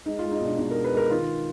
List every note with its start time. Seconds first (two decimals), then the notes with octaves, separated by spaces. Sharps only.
0.05 G#3 D#4
0.19 F4
0.23 G#3
0.31 D#4
0.41 B2 D4
0.58 B2 D#4
0.71 A#4
0.75 G#3
0.84 B4
0.93 G#3 A#4
1.10 D#3 F4